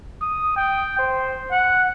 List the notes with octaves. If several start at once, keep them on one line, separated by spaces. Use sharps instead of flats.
D#6
G5
C5
F#5